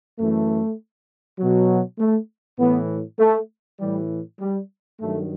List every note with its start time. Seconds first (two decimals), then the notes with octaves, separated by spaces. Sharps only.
0.19 F#2 E3 A3
1.39 B2 F#3
1.99 A3
2.59 A2 E3 B3
3.20 A3
3.80 A2 E3 G3
4.40 G3
5.00 G2 D#3 F#3 A3